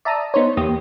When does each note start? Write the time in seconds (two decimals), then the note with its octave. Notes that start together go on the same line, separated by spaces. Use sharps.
0.05 D5 E5 A5 A#5 D#6
0.34 B3 D#4 C5 C#5
0.57 E2 A#3 G4 D#6